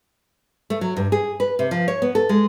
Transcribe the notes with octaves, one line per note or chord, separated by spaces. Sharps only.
A3
F#3
G2
G#4
B4
C3
F3
C#5
B3
A4
G#3